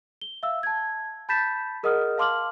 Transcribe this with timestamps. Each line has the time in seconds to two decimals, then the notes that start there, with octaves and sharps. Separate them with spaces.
0.21 G7
0.43 E5 F5 E6
0.63 A5 G#6
1.29 A5 B5 G6 A6 B6 E7
1.83 G#4 A#4 D#5 F#5 D#6 F6
2.18 F5 A5 C6 D6 F6 F#7